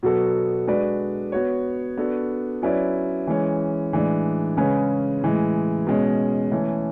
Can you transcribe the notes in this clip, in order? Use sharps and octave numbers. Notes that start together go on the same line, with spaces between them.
B2 F#3 B3 F#4 A4
G#3 D4 F#4 B4 D5
B3 F#4 C#5
B3 D4 F#4 A4
F#3 C#4 E4 B4 D5
E3 G#3 C#4
A2 E3 G#3 D4
C#3 G#3 C#4 G#4 B4
A2 E3 G#3
B2 G#3 C#4
E3 A3 C#4